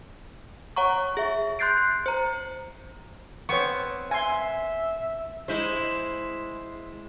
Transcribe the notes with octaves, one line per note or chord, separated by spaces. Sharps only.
C#5 F#5 A#5 C#6
G#4 E5
C6 F#6 G6 A6 C7 D7
C5 A#5
B3 C4 C#5 C#6
E5 G#5 C6
G#3 E4 C5